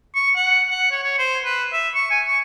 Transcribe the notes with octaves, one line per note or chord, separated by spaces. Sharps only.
C#6
F#5
F#5
C#5
C#5
C5
B4
E5
C#6
G#5
C#6